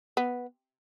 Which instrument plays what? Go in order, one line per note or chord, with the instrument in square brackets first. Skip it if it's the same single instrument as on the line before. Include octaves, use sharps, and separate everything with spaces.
[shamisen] B3